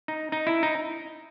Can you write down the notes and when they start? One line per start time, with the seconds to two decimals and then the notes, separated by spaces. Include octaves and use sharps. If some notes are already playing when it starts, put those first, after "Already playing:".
0.08 D#4
0.32 D#4
0.47 E4
0.63 D#4